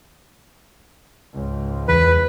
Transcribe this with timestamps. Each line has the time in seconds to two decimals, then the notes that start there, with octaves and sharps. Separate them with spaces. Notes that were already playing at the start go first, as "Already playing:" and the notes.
1.34 C#2 G#2
1.88 E2 B4